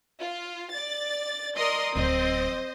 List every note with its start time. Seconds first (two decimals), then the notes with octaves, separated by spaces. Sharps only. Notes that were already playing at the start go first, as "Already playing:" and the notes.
0.18 F4
0.71 D5 A6
1.57 A#4 D5 D#5 C6 D#6
1.95 D1 F#3 C4 C5 D#5